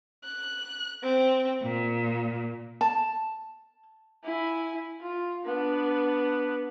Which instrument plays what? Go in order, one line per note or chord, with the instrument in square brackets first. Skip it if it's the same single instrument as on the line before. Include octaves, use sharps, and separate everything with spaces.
[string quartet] F#6
C4
A#2
[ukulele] A5
[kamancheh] E4 G#5
F4
B3 D4